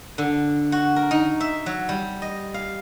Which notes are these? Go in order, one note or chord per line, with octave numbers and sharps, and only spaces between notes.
D3
F#4
A#4
D#4
E5
F#3
G3
D#5
F5